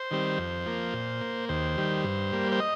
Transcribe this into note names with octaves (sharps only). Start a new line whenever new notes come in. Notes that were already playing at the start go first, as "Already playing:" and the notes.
Already playing: C5
D#3 G3 C4
F2
F3 A#3
A#2
A#3
D#2 C5
D#3 G3
G2
G3 A#3
C5
D#5